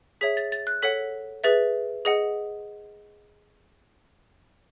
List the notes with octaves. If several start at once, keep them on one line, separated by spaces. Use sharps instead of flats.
G#4 C#5 E5 B6
A6
A6
F#6
A4 C#5 F#5 B6
G#4 B4 E5 A6
G#4 D#5 F#5